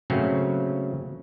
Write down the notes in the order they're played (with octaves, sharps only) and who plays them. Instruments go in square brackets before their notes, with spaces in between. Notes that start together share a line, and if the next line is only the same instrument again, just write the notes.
[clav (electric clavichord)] C#3 F#3 A3 A#3 C4 C#4